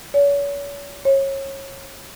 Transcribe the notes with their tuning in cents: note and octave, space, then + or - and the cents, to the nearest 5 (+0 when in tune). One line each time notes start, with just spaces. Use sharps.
C#5 +40
C#5 -25